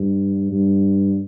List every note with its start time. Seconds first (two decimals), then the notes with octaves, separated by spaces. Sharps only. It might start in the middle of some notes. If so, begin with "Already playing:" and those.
Already playing: G2
0.52 G2